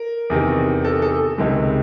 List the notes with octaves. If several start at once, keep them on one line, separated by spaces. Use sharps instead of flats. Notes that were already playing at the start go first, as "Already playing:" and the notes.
Already playing: A#4
E2 C3 D#3
A4
A4
C#2 C3 D#3 G#3